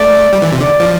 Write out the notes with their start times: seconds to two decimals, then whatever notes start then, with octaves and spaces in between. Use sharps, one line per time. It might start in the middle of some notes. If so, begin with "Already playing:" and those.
Already playing: A3 D5
0.33 G3
0.42 E3
0.53 C3
0.61 D3 D5
0.80 F3